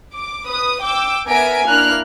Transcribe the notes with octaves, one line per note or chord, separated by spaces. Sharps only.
D6
B4 D#6
G5 D6 E6
B3 A#4 E5 G#5 B6 D7
A#3 D4 E4 F6 F#6